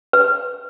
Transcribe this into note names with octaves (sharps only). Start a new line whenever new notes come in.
B4